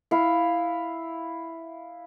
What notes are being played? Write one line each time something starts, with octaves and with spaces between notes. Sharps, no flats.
E4 F5